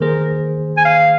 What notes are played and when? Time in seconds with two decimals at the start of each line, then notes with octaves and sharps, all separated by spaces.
0.01 D#3 A#3 G#4 A#4 C5
0.77 G#5
0.85 F5